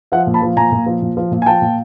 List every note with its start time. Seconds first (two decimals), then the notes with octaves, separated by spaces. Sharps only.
0.12 F3 E5 F#5
0.27 A#2
0.34 A5 B5
0.42 F3
0.57 A#2 G#5 A#5
0.72 A#2
0.86 F3
1.02 A#2
1.17 F3
1.32 A#2
1.42 G#5
1.46 F3 G5 A5
1.62 A#2